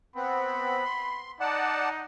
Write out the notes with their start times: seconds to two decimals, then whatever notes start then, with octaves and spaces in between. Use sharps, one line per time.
0.16 B3 C4 B5
0.84 C6
1.40 D#4 D5 F#5 A5